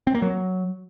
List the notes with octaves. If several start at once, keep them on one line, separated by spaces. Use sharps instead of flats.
C4
A#3
F#3